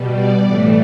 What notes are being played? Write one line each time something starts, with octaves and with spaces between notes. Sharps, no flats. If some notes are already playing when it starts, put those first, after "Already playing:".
Already playing: B2 G3
D5
A2 E3 A3